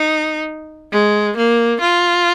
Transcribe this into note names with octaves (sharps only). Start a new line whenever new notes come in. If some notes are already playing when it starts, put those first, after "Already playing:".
Already playing: D#4
G#3
A#3
F4